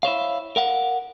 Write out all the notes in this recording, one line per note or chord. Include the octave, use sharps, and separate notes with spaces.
E4 C5 C#5 F5
A#4 F5 F#5